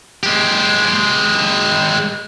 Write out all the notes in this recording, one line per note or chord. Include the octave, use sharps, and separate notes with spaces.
G#3 G4